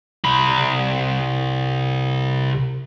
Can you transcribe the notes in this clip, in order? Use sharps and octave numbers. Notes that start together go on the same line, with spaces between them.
C2 B5